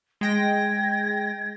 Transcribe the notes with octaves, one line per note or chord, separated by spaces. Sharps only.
G#3 G5 G#6 A#6